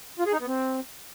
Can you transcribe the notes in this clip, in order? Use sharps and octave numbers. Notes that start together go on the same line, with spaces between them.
F4
G#4
D#4
B3
C4